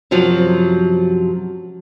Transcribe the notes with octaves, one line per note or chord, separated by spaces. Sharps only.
F#2 C3 F3 F#3